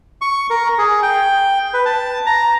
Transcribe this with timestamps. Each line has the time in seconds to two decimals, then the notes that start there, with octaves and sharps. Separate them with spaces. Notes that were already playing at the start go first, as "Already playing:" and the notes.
0.21 C#6
0.50 A#4
0.78 G#4
1.02 G5
1.74 B4
1.86 A5
2.26 A#5